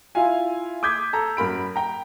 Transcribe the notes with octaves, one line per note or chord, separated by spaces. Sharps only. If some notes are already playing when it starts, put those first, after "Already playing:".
E4 F4 F5 G#5
D6 D#6 G6 G#6 B6
A4 A#5
F#2 A#4 B5 D7
G5 A#5